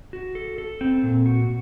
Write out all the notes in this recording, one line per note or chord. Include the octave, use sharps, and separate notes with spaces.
F#4
A4
A4
C4
A#2
F#4